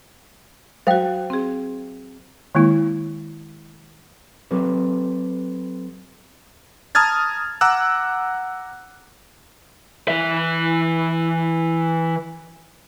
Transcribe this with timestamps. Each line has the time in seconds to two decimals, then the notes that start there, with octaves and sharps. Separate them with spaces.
0.87 F#3 F#4 C5 F5 G5
1.30 C4 G#4
2.55 D#3 G#3 A#3 E4
4.51 F#3 C4 G4 A4 B4
6.95 A5 A#5 D#6 F6 G#6 A6
7.61 F#5 A#5 D6 E6 F#6
10.08 E3 E5